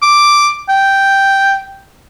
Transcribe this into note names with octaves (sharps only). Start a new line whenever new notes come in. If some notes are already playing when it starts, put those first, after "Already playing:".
D6
G5